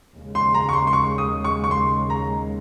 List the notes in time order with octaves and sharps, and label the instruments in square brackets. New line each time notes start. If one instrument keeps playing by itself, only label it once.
[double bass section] D#2 C#3 G#3
[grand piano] C6
A#5
C#6
C6
C6
C#6
D#6
C#6
C#6
C6
A#5